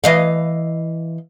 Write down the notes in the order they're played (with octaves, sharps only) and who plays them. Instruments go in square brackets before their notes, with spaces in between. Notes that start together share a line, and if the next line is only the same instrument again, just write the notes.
[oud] E3 D#5 F5